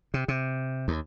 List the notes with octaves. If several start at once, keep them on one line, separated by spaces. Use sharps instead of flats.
C3
C3
D#2